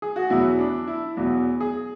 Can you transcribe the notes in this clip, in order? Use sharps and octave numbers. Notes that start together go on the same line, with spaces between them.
G#4
F#4
E2 B2 F#3 E4
D4
E4
E2 B2 F#3
G#4